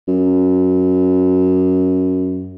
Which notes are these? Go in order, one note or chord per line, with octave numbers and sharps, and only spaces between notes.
F#2